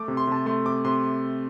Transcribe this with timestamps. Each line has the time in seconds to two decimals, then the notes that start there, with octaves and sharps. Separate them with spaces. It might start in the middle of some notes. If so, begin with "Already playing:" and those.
Already playing: A3 D6
0.08 C3
0.17 C6
0.27 C3 A5
0.46 A3 C6
0.66 C3 D6
0.85 C3 C6